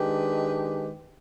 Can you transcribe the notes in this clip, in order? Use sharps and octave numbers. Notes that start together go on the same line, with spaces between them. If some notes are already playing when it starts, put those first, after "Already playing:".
Already playing: D#3 G#3 D4 G4 B4